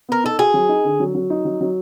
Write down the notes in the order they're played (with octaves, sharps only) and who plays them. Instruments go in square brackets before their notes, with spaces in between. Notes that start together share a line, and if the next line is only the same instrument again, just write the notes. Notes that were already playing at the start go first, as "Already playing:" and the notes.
[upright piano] B3 [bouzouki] A#4
[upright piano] D#4 [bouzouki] A4
[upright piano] F#4 [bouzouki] G#4
[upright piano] F#3
D#4
D3
F#3
F#3
D#4
F#3
F#3